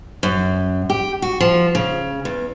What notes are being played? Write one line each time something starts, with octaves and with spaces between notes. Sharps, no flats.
F#2
G4
F#4
F3
C#3
E2